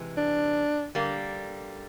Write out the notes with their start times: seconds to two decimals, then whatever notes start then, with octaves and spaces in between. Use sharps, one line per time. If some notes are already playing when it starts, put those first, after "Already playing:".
Already playing: C3 E3 G#3
0.17 D4
0.95 D3 G3 A#3